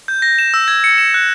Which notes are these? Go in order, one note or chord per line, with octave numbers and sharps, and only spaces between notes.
G6
A#6
E7
E6
G#6
C#7
E7
F#6